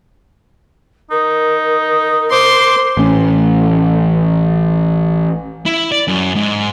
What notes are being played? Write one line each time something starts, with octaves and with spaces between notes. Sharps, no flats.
D#4 A#4
C5 C6 D6
A1 C#4
E4
D5
F#2
G#2